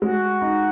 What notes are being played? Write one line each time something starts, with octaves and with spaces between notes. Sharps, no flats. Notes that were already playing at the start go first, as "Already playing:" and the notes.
G#3 F#4
D#4